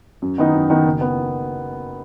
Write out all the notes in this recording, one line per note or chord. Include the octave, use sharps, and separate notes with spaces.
F#2
D#3 B3 D#4
F#2
D#3 B3 D#4
F#1
B3